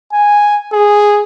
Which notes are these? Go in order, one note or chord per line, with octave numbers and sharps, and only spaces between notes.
G#5
G#4